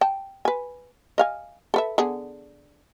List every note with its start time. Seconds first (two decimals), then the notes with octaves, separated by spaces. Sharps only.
0.01 G5 A5
0.45 B4 G#5
1.18 D#5 F5 G#5
1.74 A4 B4 E5
1.98 D3 B3 G#4